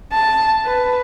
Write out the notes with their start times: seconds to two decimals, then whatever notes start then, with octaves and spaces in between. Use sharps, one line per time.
0.12 A5
0.66 B4